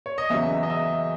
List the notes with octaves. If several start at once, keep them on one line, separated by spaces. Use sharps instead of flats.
C#5
D#5
E2 C#3 F#3 E5
D#5
E5